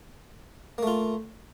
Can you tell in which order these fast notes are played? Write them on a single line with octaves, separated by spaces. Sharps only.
A#3 A3 F4